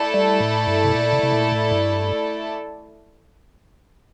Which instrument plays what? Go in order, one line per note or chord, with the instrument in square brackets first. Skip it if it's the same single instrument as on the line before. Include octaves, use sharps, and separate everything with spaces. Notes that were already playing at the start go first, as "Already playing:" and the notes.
Already playing: [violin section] A3 E4 A4 D5
[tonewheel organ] G3
A2
G2
C3
A#2
C3
C3
A#2
A2
G2